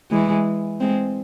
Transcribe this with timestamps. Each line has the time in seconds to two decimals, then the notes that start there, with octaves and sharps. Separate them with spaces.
0.10 E3 G#3
0.80 G#3 C4